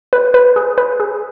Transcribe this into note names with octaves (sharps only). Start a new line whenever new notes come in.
B4
B4
G#4
B4
G#4